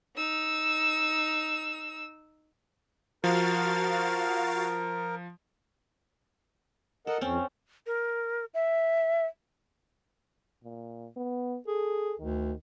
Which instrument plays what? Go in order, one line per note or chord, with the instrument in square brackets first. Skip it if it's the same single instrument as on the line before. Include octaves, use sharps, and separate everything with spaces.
[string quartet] D#4 E6
[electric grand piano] F3 [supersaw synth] F#4 F5 A6 [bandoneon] A#4
[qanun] A4 [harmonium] A#4 D#5 F#5
[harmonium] F2 [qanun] C4 C#4
[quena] A#4
E5
[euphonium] A#2
B3
[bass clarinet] G#4 [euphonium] A4
[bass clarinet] D2 [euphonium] D#3